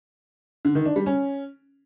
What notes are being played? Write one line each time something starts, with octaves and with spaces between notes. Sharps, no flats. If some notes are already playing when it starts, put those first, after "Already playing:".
D3
D#3
D4
G3
C#4